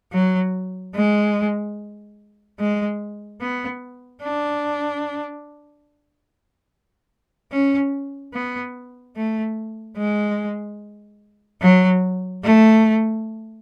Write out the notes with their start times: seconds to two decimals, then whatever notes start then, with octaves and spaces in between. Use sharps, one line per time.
0.13 F#3
0.95 G#3
2.59 G#3
3.41 B3
4.23 D4
7.52 C#4
8.34 B3
9.16 A3
9.97 G#3
11.62 F#3
12.44 A3